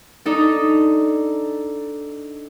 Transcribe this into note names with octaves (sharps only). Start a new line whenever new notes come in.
D4 D#4 A4